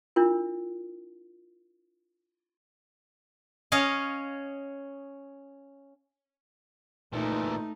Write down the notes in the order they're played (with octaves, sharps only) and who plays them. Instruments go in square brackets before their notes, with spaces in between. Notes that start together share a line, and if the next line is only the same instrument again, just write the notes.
[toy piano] D4 E4 F4 A#4
[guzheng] C#4 C#5 D#5 F5
[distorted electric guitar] A#2 E3 [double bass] A3 D#4